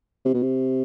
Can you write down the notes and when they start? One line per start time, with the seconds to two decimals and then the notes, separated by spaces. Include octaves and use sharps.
0.25 C3
0.34 B2
0.42 C3